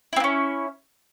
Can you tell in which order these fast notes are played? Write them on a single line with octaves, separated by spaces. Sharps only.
E4 C4 A#3 C#4